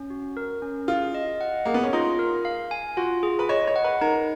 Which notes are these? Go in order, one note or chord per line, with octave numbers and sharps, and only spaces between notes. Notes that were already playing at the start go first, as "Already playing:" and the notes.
Already playing: C#4
F#4
A#4
C#4
F4 G#4
D#5
F#5
A#3 G#4
B3
C#4
D#4 F4
A#4
F5
G#5
F4 F#4
G#4
B4
C#5 D#5
C#5
F#5
B4
D#4 A#4